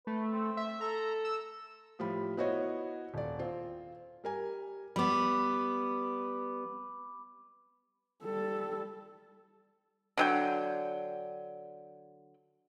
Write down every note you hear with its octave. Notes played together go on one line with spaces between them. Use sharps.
A3 B4
C4
E5
A4 A#5
E6
A2 F3 G3 B5
B3 E4 F#4 C5 C#5 D#5
D#1 D5
C4 F4
G3 A#4 G#5
G3 B3 B5 D6
G3 A4
D3 F#3 G5